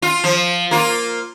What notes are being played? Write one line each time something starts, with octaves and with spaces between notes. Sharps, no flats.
F4
F3
A#3 F4